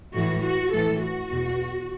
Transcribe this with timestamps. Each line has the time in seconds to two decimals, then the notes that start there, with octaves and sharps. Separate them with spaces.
0.14 A2 E3 F#4
0.44 F#4
0.73 A2 E3 A4
1.02 F#4
1.31 E2 B2